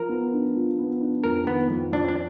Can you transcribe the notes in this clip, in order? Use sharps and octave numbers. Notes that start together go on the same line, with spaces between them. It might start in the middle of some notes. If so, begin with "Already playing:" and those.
Already playing: F3 A#4
B3
D4
F3
B3
D4
F2 A#4
D#3 B3
F2
F2 D4
D4